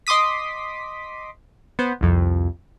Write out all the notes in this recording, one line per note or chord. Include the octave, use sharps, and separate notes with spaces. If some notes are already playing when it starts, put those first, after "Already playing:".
D#5 C6 D6 D#6 B6
B3 C5
C2 F2